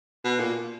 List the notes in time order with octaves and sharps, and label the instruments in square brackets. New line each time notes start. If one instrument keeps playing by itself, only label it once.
[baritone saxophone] B2
A#2